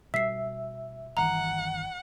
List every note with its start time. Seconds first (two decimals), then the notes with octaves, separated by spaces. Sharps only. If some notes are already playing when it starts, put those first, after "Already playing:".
0.14 B2 G3 E5 B6 C7
1.17 G1 D#3 E3 F#5 A#5